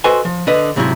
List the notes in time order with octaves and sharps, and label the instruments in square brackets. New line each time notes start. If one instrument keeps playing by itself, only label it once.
[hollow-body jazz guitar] F#4 A4 B4 C5 D#5 G#5
F3
D3 B4 D#5
D2 G#2 C3 F3 F#3 E4